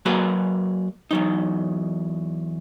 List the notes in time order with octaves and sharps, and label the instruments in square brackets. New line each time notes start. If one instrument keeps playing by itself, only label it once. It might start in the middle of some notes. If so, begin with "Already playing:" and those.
[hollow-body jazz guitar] F#3 A#3 F#4 G#4 B4
E2 F#3 D#4